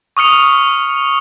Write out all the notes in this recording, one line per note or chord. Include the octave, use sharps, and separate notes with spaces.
C#6 D#6 F6 C#7 F7